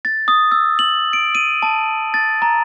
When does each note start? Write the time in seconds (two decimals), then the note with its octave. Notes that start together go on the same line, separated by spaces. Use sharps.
0.05 A6
0.28 D#6
0.51 E6
0.79 F#7
1.13 D7
1.35 D#7
1.62 A5
2.14 A6
2.42 A#5